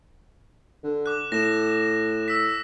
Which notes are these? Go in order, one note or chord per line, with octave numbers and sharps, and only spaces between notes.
D3
D6 F#6
A2 A#6 E7
E6 B6